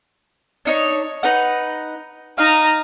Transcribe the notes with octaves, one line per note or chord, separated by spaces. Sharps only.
D4 D#4 C#5
D#4 B4 F#5
D#4 F5 A#5